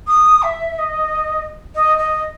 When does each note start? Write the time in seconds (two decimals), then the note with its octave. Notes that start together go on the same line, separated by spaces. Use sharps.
0.07 D#6
0.43 E5
0.78 D#5
1.75 D#5
1.98 D#5